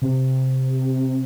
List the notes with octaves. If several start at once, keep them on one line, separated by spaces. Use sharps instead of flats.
C3